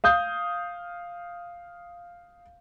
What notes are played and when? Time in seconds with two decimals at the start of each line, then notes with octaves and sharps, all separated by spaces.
0.04 F5 D#6 G6